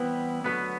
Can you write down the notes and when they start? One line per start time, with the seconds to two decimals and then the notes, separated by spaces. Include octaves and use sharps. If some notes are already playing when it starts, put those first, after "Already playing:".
Already playing: E3 G3 B3 C4 E4 B4
0.44 D3 F#3 A3 B3 B4